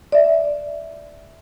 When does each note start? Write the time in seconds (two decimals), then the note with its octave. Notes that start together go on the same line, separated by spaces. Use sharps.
0.12 D5 E5